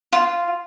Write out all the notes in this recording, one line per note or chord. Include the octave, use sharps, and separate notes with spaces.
F4